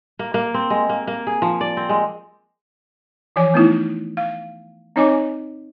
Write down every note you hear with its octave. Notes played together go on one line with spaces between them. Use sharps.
A#3
A#3
C4
G#3
A#3
A#3
G#4
F3
D5
C4
G#3
E3 F3 C#5 G#5 D6
A3 B3 D#4 E4
F5
C4 D#4 C#5 D#5 G#5 D6